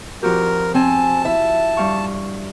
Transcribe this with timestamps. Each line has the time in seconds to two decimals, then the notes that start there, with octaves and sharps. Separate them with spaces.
0.23 F2 F#4 G4 A#4
0.74 C4 G#5 A5
1.25 E4 E5
1.77 G2 F5 C#6